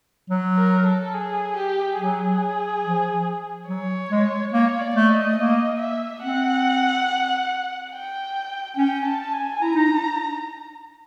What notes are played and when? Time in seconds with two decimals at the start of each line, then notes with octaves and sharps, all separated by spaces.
0.30 F#3
0.58 A#4
0.86 A4
1.14 G#4
1.57 G4
1.99 F#3 G#4
2.84 F3
3.68 F#3 C#5
4.11 G#3
4.53 A#3 C#5
4.81 D5
4.96 A3
5.09 D#5
5.37 A#3 D#5
5.80 E5
6.23 C4 F#5
7.92 G5
8.77 C#4 G5
9.05 A5
9.33 G#5
9.61 E4 A#5
9.75 D#4
9.88 D4